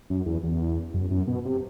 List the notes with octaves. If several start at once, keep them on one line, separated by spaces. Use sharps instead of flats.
F#2
E2
E2
F#2
F#2
B2
C3